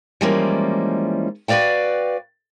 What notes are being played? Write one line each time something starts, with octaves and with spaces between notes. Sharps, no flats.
E3 F3 G3 G#3 A#3 C#4
F#4 B4 C#5 D5 F5 G5